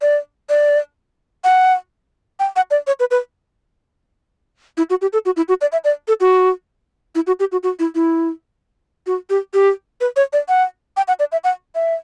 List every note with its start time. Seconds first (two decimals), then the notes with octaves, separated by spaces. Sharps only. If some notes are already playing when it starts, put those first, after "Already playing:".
0.02 D5
0.49 D5
1.44 F#5
2.40 G5
2.56 F#5
2.71 D5
2.87 C#5
3.00 B4
3.11 B4
4.77 E4
4.90 F#4
5.02 G4
5.13 A4
5.26 F#4
5.37 E4
5.48 F#4
5.61 D5
5.72 E5
5.84 D5
6.08 A4
6.20 F#4
7.15 E4
7.27 F#4
7.40 G4
7.52 F#4
7.63 F#4
7.79 E4
7.95 E4
9.07 F#4
9.30 G4
9.54 G4
10.01 B4
10.16 C#5
10.33 D5
10.49 F#5
10.97 G5
11.08 F#5
11.20 D5
11.32 E5
11.44 F#5
11.75 E5